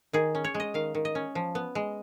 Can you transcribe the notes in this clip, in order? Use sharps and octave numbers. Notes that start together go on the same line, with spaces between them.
D#3 G#4
C#4
C#5
G#3
D#5
D#3 F5
D#3
D#5
C#4
F3
B3
G#3